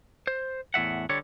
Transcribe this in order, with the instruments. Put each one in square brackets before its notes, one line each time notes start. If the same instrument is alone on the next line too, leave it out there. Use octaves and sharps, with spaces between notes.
[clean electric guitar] C5
E2 A2 E5 F#5
D3 G3 C#5